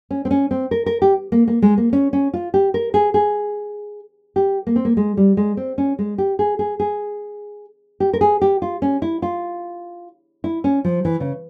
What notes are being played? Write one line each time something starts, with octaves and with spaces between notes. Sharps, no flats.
C#4
C4
C#4
C4
A#4
A#4
G4
A#3
A#3
G#3
A#3
C#4
C#4
F4
G4
A#4
G#4
G#4
G4
A#3
C4
A#3
G#3
G3
G#3
C4
C#4
G#3
G4
G#4
G#4
G#4
G4
A#4
G#4
G4
F4
C#4
E4
F4
E4
C#4
F3
E3
C#3